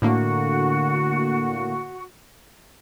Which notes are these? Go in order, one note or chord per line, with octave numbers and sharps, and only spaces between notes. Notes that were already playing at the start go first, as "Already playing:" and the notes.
A2 D3 A#3 F#4